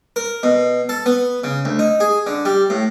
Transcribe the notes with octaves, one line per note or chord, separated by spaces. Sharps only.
A#4
B2
A4
B3
C#3
D2
D#4
G#4
D3
G3
A2